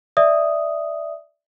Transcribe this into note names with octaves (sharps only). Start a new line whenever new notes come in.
D5 E5 D#6